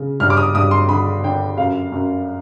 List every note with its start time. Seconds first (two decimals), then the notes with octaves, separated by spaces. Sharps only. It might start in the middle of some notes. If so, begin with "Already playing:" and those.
Already playing: C#3
0.20 G2 F6
0.30 D6
0.37 D#6
0.55 G2 D#6
0.71 C6
0.89 D3 B5
1.23 D3 G5
1.58 F#2 F5
1.92 F#2